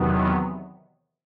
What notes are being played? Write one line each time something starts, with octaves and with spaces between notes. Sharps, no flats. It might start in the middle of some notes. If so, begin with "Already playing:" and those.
Already playing: E2 C3 D#3 F#3 B3